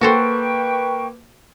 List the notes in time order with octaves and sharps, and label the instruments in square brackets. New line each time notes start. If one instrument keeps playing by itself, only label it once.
[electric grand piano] A#3 [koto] F#4 A4 C5 [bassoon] B4 [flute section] G5 C#6